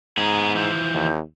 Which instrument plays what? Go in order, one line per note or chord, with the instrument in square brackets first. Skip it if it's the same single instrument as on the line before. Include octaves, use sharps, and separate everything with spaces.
[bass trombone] G#2 [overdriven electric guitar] B3 G#4 [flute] A#5
[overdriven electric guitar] E3 F3 [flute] G6
[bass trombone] D#2